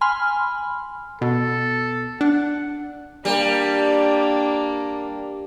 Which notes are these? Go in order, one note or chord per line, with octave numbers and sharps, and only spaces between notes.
G#5 B5 C6 F6
B2 A4
D4 F#5
G3 A#3 D4